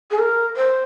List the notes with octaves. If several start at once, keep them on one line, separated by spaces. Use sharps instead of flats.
G#4
A#4
C5